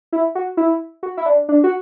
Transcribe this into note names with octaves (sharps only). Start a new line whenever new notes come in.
E4
F#4
E4
F#4
E4
D4
D4
F#4